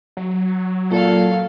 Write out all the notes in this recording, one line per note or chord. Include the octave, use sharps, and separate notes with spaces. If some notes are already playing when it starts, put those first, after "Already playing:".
F#3
A#2 A4 F5